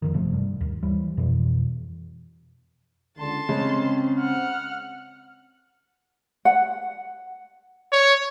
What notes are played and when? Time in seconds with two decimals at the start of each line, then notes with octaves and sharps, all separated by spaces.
0.02 F2 G#2 D#3
0.14 G1 C3 F3 A3
0.33 G2
0.61 D#2
0.83 E3 G3
1.17 F2 B2 E3
3.18 C#2 D3 A5 C6
3.49 C#3 G#3 C4 C#4
4.18 F#5 F6
6.45 F#5
7.92 C#5